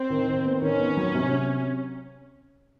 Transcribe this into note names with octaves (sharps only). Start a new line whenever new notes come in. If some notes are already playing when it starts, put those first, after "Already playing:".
Already playing: C4
D#3
D#3
B3
D#3 C#4
B3
F#3
C3